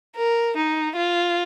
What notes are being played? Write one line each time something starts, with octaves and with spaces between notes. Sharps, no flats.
A#4
D#4
F4